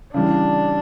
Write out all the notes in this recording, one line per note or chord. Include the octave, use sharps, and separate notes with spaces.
C#3 E3 G3 D4